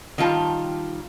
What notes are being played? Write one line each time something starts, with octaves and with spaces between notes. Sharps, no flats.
D#3 G3 F4 A5